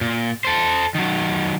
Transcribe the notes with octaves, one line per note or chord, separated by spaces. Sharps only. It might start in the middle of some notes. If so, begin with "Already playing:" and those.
A#2
A4 C5
D#3 F#3